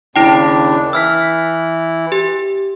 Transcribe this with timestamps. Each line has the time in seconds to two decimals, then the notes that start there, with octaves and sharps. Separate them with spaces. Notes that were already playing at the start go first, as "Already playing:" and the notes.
0.16 D#2 C#3 D4 E4 G5
0.93 E3 E4 E6 F6 B6
2.12 G4